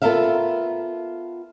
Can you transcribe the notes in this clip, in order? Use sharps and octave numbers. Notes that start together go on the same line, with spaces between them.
B3 F4 A4 A#4 E5 F5